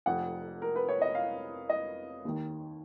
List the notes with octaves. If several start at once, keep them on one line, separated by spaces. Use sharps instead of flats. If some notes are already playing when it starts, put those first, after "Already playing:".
F1 F2 F3 F#5
A#4
B4
C#5
D#5
F5
D#5
D#2 D#3